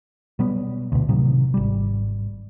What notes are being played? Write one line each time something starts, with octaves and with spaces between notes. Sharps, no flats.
B2 F#3 G3 B3
D2 B2
A2 C3 D#3 F#3
G#1 G3